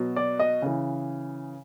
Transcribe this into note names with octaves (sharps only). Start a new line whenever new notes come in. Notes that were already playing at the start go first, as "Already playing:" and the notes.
Already playing: B2 F#3
D5
D#5
C#3 E3